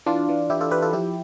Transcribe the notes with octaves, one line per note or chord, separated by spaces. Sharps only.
E3 D4 F4
E3
E3 E4 G4
F4 A4
E3 G4 B4
F4 A4
F3 E4 G4